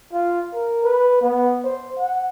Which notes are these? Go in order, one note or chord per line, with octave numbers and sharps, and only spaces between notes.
F4
A#4
B4
B3
C5
F#5